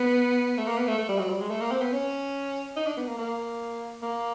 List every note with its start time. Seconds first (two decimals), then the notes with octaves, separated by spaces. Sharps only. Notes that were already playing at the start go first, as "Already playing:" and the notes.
Already playing: B3
0.58 A3
0.67 A#3
0.78 B3
0.87 A3
0.98 A3
1.09 G3
1.19 F#3
1.30 G3
1.41 G#3
1.50 A3
1.61 A#3
1.71 C4
1.82 B3
1.93 C#4
2.76 D#4
2.87 D4
2.97 B3
3.07 A#3
3.18 A#3
4.02 A#3